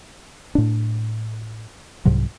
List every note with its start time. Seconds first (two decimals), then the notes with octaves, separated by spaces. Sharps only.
0.55 A2 D4
2.05 C2 G#2 C3 F#3